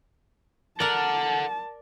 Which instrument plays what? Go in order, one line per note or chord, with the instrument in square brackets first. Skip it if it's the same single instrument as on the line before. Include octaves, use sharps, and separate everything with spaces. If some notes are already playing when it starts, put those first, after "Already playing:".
[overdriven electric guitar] A4 F#5 [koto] A#4 D5 [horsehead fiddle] A5